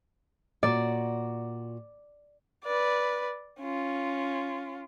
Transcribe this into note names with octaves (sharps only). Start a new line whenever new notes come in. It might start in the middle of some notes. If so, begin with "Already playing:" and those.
A#2 F#4 D5
B4 D5
C#4 F4